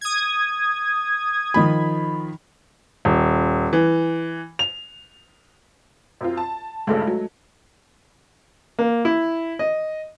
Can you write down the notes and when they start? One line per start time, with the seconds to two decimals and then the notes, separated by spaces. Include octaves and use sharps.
0.01 D#6 G#6
1.54 D#3 F3 B5
3.05 D#1
3.73 E3
4.59 F7
6.21 F#2 C4 F4
6.37 A5
6.87 D2 G2 C#3 G#3 A3 A4
7.07 F#3
8.79 A#3
9.05 E4
9.59 D#5